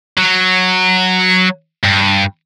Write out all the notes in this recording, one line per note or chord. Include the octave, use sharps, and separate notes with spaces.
F#3
G2